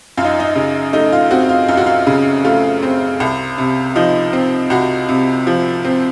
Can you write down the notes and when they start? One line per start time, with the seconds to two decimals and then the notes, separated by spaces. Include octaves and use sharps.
0.17 F#2 F4
0.24 D#4
0.40 D#4
0.56 C#3
0.93 A3 D#4
1.12 F4
1.31 C4 F#4
1.49 F4
1.68 F#2 F4
1.77 F#4
1.86 F4
2.07 C#3
2.45 A3 F4
2.83 C4
3.20 C2
3.58 C3
3.96 F3 D#4
4.33 C4
4.70 C2 F#4
5.09 C3
5.47 F3
5.85 C4